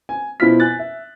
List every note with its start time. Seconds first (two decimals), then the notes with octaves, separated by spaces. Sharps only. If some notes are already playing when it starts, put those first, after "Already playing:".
0.09 G#5
0.40 B2 E4 F4 C5 F6 B6
0.60 G#5 F#6 A6
0.79 E5